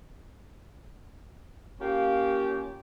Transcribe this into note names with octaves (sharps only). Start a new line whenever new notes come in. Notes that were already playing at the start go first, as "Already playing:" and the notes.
A#3 C#4 F4 G4